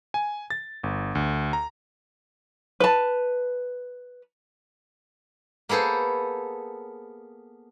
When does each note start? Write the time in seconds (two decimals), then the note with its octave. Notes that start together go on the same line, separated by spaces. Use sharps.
0.14 G#5
0.50 A6
0.83 G1
1.15 D2
1.53 A#5
2.80 B4 A5
5.69 A#3 B3 G#4 A4 C5